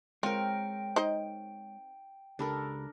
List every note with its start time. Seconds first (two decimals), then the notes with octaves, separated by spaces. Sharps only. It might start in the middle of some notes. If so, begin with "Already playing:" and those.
0.23 G#3 C4 F4 A#4 C#5 G5
0.96 D#4 C5 D#5
2.39 C#2 D4 G4 A4 A#4 B5